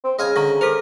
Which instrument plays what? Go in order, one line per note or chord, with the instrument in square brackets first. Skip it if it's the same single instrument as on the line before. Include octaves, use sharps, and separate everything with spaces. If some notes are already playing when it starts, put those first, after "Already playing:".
[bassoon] C4
[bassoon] C#3 [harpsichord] D#5 F5 G#5
[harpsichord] D3 [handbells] A#5 C#6 A#6
[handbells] A4 C5 [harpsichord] A#4